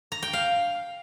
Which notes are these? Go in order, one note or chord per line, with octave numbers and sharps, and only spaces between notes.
A#5
G5
F5